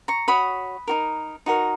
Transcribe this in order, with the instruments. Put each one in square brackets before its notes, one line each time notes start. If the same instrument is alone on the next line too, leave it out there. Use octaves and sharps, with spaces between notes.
[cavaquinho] A#5 C#6
F#4 C#5 B5 D#6
D#4 F#4 A#4
D#4 F#4 A#4